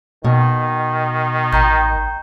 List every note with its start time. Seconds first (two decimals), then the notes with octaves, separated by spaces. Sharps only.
0.24 B2 D#3
1.53 A1 G5 A#5 G6